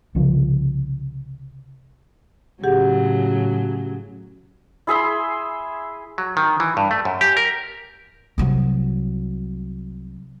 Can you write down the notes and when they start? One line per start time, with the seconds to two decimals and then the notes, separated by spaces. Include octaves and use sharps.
0.15 C2 C#3 F3 C#4
2.64 A2 C#3 F#3 G4 G#4 F#5
4.87 E4 G#4 E5 C6
6.18 F#3
6.37 D#3
6.60 E3
6.77 G2
6.91 A3
7.05 F#2
7.21 G4
7.37 A#4
8.38 C2 F#3